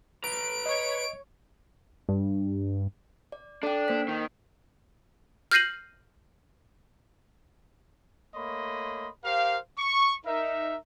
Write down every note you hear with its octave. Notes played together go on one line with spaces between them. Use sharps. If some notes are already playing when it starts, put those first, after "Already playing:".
B4 A#5 D7
C#5 D#5
G2
D5
D4 A4 G5
A#3 C5 B6
D#3
F6 G6 A#6 C7 D#7 F#7
A3 A#3 C#5 D#5 B5 C6
G4 A#4 C5 F5
C#6
D#4 A#4 E5